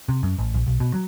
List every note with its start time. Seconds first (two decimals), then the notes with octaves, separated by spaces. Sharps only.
0.09 C3
0.23 F#2
0.38 A1
0.54 A#1
0.67 B1
0.80 B2
0.94 F#3